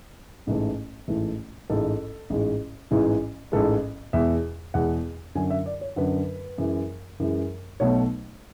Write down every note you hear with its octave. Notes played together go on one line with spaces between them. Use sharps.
A1 G#2 E3 A3
A1 G#2 E3 A3
A1 G#2 G#3 A4
A1 G#2 G#3
A1 G#2 E3 G#3
A1 G#2 E3 G#3 A4
E2 B2 G#3 E5
E2 B2 G#3 F#5
F#2 D3 F#3 G#5
E5
D5
C#5
F#2 D3 F#3 B4
F#2 E3 G#3
F#2 E3 G#3
B1 B2 F#3 A3 C#5